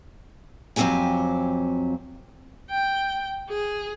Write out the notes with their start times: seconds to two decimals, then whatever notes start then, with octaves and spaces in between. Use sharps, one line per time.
0.76 F2 F#3 C4 F#4 G4 G#5
2.70 G5
3.49 G#4